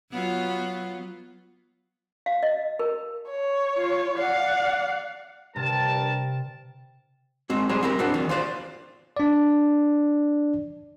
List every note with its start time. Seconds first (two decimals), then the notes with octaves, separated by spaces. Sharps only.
0.12 F#3 B3 F4
2.26 F5
2.43 D#5
2.79 A#4
3.29 C#5
3.77 F4
4.18 D5 F5 F#5
5.56 G2 C3 A#4 A5
7.50 G#3 C4 F#4
7.69 G3 G#3 G#4 C5 A#5
7.83 C4 E4 G4 A#4
7.99 C4 D4 F#4 C5
8.14 E2 D#3
8.29 F4 B4 C5 D5
9.17 D4 D5